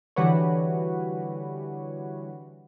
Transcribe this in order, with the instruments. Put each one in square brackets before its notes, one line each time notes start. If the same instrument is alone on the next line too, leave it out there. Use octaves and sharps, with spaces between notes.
[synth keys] D3 E3 G3 F#4 B4 C#5